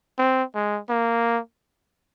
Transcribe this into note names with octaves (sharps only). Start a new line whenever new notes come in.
C4
G#3
A#3